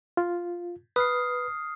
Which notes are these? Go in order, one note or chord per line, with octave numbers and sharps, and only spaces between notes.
F4
B4 D#6 F6 C7